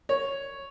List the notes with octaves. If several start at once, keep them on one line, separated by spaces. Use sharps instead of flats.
C#5